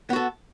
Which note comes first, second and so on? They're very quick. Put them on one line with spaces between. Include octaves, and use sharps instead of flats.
B3 F#4 A4